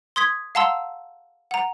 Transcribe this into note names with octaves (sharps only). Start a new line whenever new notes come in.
C6 D#6 G#6 B6
F5 F#5 A5 A#5 C6 E6
F#5 A#5